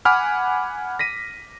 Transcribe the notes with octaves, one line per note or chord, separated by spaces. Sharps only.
F#5 G#5 B5 D6 F6
A#6 B6 D#7